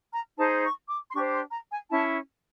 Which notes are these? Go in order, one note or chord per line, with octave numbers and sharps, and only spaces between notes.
A#5
D#4 G#4 C5 A5
C#6
D6
C6
D4 G4 C5 C#6
C6
A#5
G#5
C#4 E4 A5